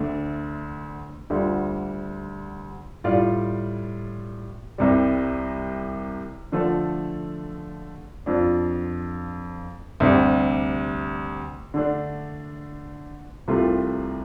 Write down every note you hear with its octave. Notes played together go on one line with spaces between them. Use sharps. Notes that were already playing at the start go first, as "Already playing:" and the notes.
Already playing: D2 D3 A3 D4
D2 D3 G3 F4
A2 G3 F4 D5 F5
C2 C3 G3
D3 F3 A3 D4 A4
F2 F3 D4
D2 C3 G3
D3 A3 D4
C2 C3 A3 F4